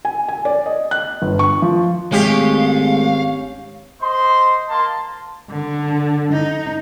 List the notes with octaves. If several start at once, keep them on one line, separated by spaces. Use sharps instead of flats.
G#5
G#5
D5
D#5
F#6
G1
C#6
F3
G#1 G#3 A3 C#4 G4 F5
C5 D#5 C6
A#3 A5 C6
D3
D#4